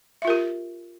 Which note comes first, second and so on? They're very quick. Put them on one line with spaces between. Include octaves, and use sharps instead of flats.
E5 F4 A#4 G4